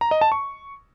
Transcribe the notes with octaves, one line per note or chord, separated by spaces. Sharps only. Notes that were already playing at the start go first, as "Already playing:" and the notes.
A#5
D#5
A5
C#6